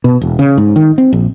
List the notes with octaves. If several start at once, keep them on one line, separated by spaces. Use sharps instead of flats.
B2
E1
C#3
G#2
D#3
C4
A#1